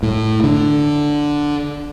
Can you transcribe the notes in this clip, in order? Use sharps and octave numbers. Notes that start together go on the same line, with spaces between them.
A2
D3